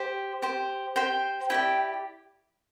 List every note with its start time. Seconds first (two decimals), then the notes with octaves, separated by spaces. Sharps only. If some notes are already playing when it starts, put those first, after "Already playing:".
Already playing: G4 C5
0.42 G4 C5
0.96 G4 C5 G5
1.50 E4 G4 D5 G5